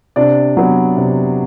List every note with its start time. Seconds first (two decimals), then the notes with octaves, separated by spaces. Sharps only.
0.16 C3 D4 D5
0.57 F#3 B3
0.97 C3